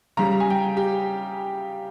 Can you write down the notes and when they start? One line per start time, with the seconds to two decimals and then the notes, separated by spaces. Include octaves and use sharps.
0.17 C#3 G3 A#5
0.40 G#5
0.50 G5
0.77 G4